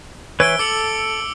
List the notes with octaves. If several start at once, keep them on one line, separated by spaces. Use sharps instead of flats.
E3 B4 C#5 E6 D7 G7
A4 D6 C#7 F#7